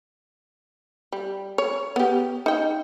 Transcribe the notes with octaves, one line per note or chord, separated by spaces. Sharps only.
G3
C#5
B3 G4
D#4 G5